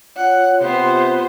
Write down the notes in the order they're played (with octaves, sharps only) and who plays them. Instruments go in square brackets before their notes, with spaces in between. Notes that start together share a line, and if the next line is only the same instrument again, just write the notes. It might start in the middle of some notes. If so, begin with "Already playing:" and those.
[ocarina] F4 [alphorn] C#5 [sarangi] F#5
[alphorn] C3 [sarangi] B3 [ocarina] F4 [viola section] C5